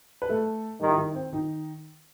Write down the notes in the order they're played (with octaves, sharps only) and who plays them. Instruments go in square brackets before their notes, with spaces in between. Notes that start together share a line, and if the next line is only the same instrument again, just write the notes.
[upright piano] B4
A3 A4
[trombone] D#3 [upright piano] G3 G4
[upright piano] E4
D#3 D#4
C4
D#3 D#4